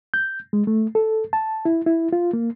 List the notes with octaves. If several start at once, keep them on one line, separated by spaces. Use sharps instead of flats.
G6
G#3
A3
A4
A5
E4
E4
F4
A#3